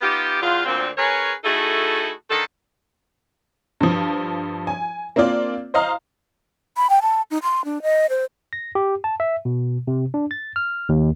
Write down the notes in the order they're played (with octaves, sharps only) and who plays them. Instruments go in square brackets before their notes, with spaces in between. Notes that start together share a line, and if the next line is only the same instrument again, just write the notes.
[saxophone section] B3 D#4 F4 G4
E2 F4
D2 A#2 C4
C#4 G#4 A#4 B4 C#5
A3 D#4 E4 F#4 G#4 A4
D3 D#3 D#4 A4
[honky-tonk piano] G2 F3
G#5
A#3 C4 D4 F4 D5
C5 D#5 F5 A#5
[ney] B5
G5
A5
D#4
C6
D4
D#5
C5
[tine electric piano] A#6
G4
A5
E5
B2
C3
D4
A6
F6
D#2